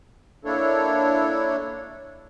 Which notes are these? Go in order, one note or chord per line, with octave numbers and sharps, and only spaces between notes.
A#3 D4 E4 A4 C#5